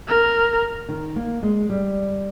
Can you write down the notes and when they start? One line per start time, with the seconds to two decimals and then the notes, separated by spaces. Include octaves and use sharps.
0.08 A#4
0.89 D#3
1.16 A#3
1.43 G#3
1.70 G3